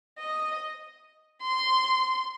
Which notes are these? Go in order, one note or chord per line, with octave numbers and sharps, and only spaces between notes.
D#5
C6